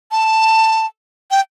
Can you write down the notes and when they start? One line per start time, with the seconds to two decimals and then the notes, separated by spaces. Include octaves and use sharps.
0.11 A5
1.31 G5